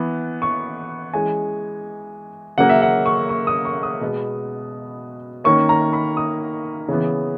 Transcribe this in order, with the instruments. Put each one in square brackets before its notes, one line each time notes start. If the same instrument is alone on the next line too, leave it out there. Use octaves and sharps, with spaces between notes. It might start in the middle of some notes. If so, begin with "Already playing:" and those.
Already playing: [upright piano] E3 B3
C#6
E3 G#3 C#4 G#5
C#3 F#3 A#3 F#5
E5
F#5
C#6
C#6
D#6
C#6
D#6
B2 G#3 B3
D#3 A#3 C#4 C#6
A#5
B5
D#6
C#3 E3 B3